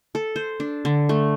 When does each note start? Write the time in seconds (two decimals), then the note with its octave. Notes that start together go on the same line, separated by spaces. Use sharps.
0.15 A4
0.36 C5
0.60 D4
0.85 D3
1.09 A3